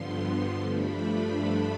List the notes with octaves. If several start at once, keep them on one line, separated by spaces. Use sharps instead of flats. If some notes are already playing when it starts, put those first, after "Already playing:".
Already playing: G2 D3 F3 B3 C6
G2 F3 A3 D4 B5
B5